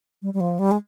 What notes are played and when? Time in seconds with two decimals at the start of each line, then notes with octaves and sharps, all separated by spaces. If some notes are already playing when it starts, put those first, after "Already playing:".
0.22 G3
0.34 G3
0.40 F3
0.59 G3
0.71 G#3